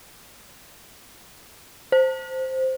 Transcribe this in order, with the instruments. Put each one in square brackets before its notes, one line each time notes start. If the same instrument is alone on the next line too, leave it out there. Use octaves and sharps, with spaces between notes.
[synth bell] C5